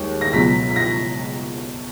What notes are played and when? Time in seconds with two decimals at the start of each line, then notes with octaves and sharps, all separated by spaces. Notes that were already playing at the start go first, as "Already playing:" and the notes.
Already playing: D#2 D#3 G#3
0.21 A#6
0.33 C#2 B2 F#3 B6
0.71 B6
0.76 A#6